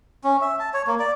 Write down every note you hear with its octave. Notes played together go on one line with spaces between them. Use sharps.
C#4
E5
A5
C#5
A#3
D5